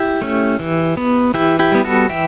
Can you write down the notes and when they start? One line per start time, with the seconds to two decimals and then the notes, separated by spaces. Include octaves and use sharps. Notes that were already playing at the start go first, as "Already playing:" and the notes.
Already playing: E4 G4
0.22 A3 C#4
0.59 E3
0.97 B3
1.34 E3 E4 G4
1.59 E4 G4
1.72 G3 B3
1.84 F#4 A4
2.09 E3 E5 G5